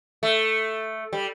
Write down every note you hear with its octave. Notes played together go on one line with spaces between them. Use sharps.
A3
G3